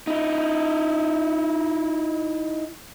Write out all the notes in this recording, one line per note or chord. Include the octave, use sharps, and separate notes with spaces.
D#4 E4